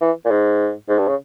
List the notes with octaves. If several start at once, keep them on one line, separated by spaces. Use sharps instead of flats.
E3
A#2
G#2
G#2
G2
C#3